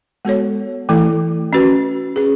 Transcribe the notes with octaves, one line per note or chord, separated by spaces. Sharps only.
G#3 B3 F#4 A4 C#5
E3 A3 E4 A4
C#4 F#4 B4
C#4 G#4 B4